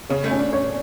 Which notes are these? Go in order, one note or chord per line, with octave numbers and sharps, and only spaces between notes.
C#3 C#5
A3
C#4
D4
C#5